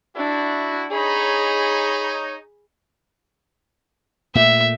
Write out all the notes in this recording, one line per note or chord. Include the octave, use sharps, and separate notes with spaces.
D4 E4 F#4
D#4 G#4 C#5 B5
A#2 A3 E5